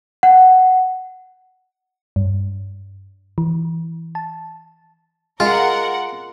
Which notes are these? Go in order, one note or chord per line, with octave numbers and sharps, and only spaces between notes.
F#5
G2
E3
A5
G#3 F4 A#4 F#5